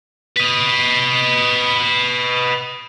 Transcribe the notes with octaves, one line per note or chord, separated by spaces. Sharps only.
B4 D#5